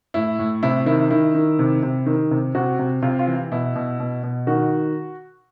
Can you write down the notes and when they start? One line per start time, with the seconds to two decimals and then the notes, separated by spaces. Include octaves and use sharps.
0.14 A2 E4
0.39 A2
0.63 C3 E4
0.86 D#3 E4
1.10 D#3 E4
1.34 D#3
1.59 C3
1.83 C3
2.06 D#3
2.31 C3
2.55 C3 F#4
2.79 C3
3.03 C3 F4
3.19 F4
3.27 E3
3.52 B2 E4
3.76 B2
4.00 B2
4.23 B2
4.47 D#3 F#4